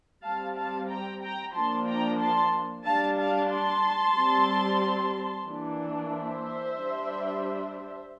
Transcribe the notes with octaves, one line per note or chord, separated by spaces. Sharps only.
G3 C4 F5 A5
F5 A5
G5 A#5
G5 A#5
F3 A#3 D4 A5 C6
G5 A#5
A5 C6
G3 D4 F5 A5
F5 A5
A5 C6
G3 C4
E3 A#3 D4
C5 E5
G3 D4